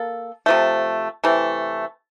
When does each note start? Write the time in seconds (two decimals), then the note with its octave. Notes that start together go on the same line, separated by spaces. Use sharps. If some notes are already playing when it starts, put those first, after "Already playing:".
Already playing: A#3 A4
0.46 C3 F3 A3
1.24 C3 E3 A3